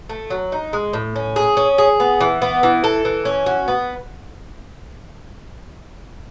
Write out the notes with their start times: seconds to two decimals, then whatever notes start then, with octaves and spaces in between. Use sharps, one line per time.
0.10 A3
0.30 F#3
0.52 D#4
0.73 G#3
0.93 A2
1.16 C#4
1.36 G#4
1.57 C#4
1.78 G#4
2.00 B3
2.21 E3
2.42 B3
2.63 E3
2.84 A4
3.05 E3
3.25 C#4
3.46 F#4
3.68 B3